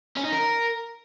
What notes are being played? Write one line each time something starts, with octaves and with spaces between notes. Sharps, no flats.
C#4
D#4
A#4